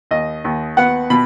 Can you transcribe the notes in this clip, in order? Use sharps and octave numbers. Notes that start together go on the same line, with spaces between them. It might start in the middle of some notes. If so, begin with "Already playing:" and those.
D#2 D#5
D#2
B3 F#5
B2 B5